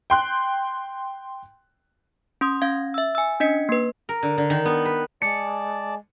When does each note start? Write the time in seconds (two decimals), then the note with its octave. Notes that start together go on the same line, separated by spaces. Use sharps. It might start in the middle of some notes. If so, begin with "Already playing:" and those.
0.10 G5 C6 F#6
2.41 C#4 C6 D#6
2.62 C#4 F5 G#6
2.94 E5 E6
3.15 G#5 E6
3.40 C#4 D4 D#5 B6 C#7
3.69 A#3 B4
4.09 A#4
4.23 D3
4.38 D3
4.50 D#3
4.65 B3
4.85 B4
5.22 G#3 D5 A5 C#7